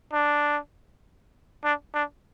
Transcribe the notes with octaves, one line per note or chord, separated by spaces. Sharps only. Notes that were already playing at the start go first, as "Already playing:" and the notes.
D4
D4
D4